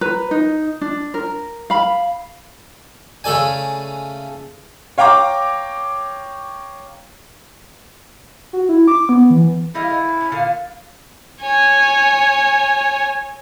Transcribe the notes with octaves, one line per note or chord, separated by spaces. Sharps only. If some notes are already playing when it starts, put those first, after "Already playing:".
B4 A#5
D#4
D4
A#4
F5 B5
C#3 A3 A4 D5 G#5
C#5 F5 G5 A#5 D6
F#4
E4
D6
B3
E3
G3 E4 D#5 F5
D3
A2
C#4
A#2 D3 F5
C#5 G#5